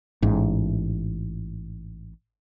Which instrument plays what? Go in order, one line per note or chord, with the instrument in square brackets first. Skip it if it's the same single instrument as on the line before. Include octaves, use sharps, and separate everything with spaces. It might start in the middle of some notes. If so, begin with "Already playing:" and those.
[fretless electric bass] A1 G#2